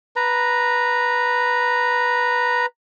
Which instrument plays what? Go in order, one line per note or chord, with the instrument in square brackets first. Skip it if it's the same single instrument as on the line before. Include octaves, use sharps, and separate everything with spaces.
[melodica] B4 A#5